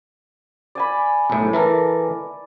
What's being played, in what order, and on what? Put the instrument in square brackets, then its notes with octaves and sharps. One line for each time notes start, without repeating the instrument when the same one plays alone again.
[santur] D5 G#5 B5
[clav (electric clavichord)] B1 A2
E3 A4 A#4